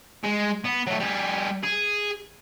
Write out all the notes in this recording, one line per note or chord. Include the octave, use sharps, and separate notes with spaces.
G#3
B3
F#3 A3
G3 G#4
G#4